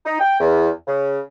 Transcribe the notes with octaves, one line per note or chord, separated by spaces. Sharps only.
D#4
G5
E2
C#3